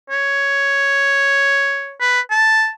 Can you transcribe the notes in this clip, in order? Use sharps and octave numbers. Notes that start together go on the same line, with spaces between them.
C#5
B4
A5